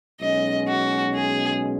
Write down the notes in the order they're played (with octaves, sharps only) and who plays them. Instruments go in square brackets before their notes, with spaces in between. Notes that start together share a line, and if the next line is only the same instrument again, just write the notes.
[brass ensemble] B1 B2 G#3 C#4 [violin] D#5
[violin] F#4
G#4